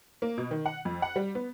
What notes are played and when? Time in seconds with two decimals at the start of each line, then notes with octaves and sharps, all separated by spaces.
0.22 A#3
0.38 B2
0.51 D#3
0.66 F#5
0.85 F2
1.02 F#5
1.16 G3
1.35 B3